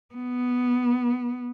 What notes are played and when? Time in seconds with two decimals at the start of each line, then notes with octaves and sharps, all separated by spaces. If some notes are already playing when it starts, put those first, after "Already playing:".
0.15 B3